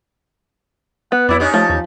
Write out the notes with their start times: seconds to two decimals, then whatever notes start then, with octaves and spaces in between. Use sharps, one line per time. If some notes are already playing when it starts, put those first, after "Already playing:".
1.12 B3 F#5
1.29 F2 F#3 E4 D5
1.40 B3 C#4 D#4 G4
1.54 F3 A3 A5
1.70 E2